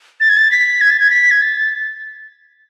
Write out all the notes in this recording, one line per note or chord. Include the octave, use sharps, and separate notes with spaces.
A6
G#6
A6
B6
G#6
A6
G#6
B6
G#6
A6